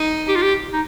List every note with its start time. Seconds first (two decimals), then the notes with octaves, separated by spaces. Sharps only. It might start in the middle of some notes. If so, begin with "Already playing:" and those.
Already playing: D#4
0.28 G4
0.35 F4
0.42 G4
0.73 D#4